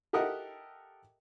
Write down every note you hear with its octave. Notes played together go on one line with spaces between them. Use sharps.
G4 A4 A#4 D#5 E5 F#5